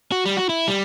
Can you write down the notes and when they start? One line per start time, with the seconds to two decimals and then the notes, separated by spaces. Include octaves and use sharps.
0.12 F#4
0.25 G3
0.37 F#4
0.49 E4
0.68 G3